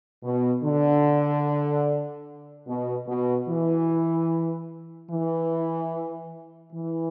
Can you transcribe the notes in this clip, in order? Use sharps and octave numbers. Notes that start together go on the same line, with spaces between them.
B2
D3
B2
B2
E3
E3
E3